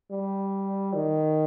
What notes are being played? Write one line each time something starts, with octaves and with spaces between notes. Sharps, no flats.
G3
D#3